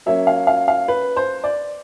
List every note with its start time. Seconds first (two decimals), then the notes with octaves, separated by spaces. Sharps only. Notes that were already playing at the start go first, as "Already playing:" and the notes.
0.06 F#3 A#3 C#4 E5
0.27 F5
0.47 F5
0.68 F5
0.88 B4
1.16 C5
1.44 D5